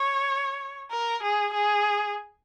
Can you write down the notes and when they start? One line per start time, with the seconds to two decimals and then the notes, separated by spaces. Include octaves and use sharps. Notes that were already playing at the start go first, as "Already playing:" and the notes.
Already playing: C#5
0.91 A#4
1.23 G#4
1.53 G#4